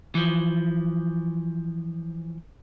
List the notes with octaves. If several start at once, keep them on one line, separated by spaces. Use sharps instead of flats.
E3 F3